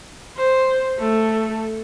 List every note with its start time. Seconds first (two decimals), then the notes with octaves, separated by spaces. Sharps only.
0.37 C5
0.99 A3 A4